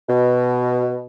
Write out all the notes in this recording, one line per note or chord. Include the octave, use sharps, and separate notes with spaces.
B2